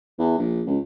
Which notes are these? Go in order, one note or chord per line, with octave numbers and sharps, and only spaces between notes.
E2
A#1
C#2